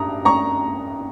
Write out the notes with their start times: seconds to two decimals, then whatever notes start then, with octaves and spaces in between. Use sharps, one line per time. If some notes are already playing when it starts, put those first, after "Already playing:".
Already playing: G2 A#5 D#6
0.25 A#5 C#6